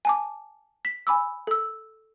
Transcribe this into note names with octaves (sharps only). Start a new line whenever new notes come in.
G#5 A5 D6
B6
G#5 B5 D6 E6
A4 E6